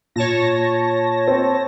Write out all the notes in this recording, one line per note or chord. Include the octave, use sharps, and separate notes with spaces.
A#2 C#5 A5 A#6
C4